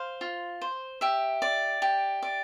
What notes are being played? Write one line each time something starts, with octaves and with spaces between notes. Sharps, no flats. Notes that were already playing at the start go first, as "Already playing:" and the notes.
Already playing: C5 F5
F4
C5
G4 E5
D5
G4
D5